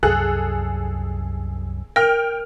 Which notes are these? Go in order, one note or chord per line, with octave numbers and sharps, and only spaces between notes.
C2 F#2 G#4 A4 F#6
A#4 G5 F6